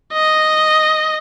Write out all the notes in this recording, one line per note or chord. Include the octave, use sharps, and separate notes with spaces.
D#5